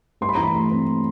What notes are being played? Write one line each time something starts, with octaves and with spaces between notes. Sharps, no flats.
G2 C6
B5
E3 A#5
B5
A3
C4